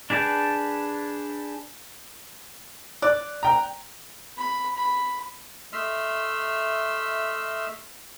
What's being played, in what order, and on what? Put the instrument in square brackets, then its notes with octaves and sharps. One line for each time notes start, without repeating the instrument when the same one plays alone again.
[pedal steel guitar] D4 G#4 B4 G5 A5
[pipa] D5 [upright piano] F#6
[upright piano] G5 A#5
[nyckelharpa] B5
B5
[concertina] A3 D#5 E5 C6 E6 F6